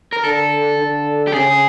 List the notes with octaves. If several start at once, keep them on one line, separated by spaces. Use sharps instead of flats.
A#4
D3 A4
D3
G4
C#3 G#4